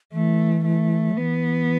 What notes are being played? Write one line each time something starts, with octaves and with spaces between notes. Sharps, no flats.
E3 A3
A3
F#3
E3 B3